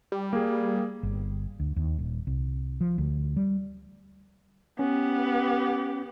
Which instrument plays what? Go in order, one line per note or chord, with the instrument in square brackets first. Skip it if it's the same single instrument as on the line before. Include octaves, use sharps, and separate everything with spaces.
[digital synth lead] G3
[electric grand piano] A#3 G#4
[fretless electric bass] G1
D2
D#2
D#1
C2
F3
D2
G3
[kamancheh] B3 G4 [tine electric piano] C#4